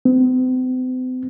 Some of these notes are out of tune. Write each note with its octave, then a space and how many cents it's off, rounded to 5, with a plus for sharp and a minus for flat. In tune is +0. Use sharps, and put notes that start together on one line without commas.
C4 -45